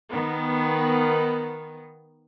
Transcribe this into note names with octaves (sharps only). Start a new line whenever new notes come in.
D#3 B3